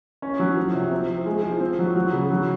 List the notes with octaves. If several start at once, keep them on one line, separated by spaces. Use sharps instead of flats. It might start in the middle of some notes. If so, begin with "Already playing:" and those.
C#4
F#3
F3
C3
C4
F3
G#3
F3
C4
F#3
F#3
C#3
F#3